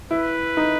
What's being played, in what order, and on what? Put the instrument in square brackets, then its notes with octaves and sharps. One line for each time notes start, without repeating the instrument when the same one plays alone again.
[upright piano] E4 [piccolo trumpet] B4
[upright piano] D#4